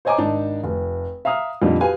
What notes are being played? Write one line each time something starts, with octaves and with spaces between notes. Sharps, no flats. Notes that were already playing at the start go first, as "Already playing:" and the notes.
C5 C#5 D#5 G#5 A#5 D6
G#1 D4 D#4 A5
F1
E5 F5 A#5 D#6 F6
F2 A#2 D3 G3 D#4
F#4 G4 B4 F5 G#5